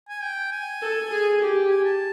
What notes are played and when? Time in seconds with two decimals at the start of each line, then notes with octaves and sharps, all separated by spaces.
0.09 G#5
0.23 G5
0.52 G#5
0.81 A4
1.11 G#4
1.41 G4
1.70 G#5
1.85 A5